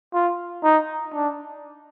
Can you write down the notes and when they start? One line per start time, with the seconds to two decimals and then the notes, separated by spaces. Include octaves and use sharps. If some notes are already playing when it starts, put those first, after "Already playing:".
0.13 F4
0.63 D#4
1.13 D4